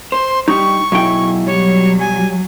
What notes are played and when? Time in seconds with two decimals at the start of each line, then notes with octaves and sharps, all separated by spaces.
0.12 C5 C6
0.48 G3 D#4 G4 C#6
0.92 B1 F#3 E4 G#4 G5
1.47 F#3 G3 C#5
2.00 G#5